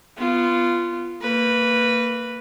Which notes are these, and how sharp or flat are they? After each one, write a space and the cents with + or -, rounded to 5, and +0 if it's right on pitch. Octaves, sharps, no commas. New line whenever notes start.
B3 +10 F4 -15
A#3 -25 B4 +0